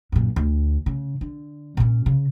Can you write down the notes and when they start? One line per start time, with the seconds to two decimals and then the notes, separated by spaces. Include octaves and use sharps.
0.12 F#2 A#2
0.36 D2
0.86 C#3
1.21 D3
1.77 A#2 C#4
2.06 C#3